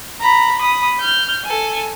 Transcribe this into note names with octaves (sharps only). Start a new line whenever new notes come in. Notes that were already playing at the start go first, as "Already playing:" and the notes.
A#5 B5
B5 D#6
F6 G6
A4 G#5